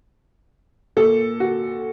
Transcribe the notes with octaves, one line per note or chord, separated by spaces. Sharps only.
A#2 A4
F#4